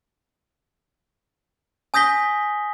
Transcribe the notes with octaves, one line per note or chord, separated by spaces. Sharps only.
G#5 D#6 G6 A#6 B6 G7